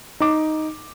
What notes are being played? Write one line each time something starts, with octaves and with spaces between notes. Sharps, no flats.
D#4 D6